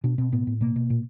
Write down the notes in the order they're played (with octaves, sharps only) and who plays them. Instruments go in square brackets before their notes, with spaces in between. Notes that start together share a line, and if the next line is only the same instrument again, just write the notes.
[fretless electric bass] B2 D4
B2 C4
A2 B3
A2
B2 A#3
B2
A#2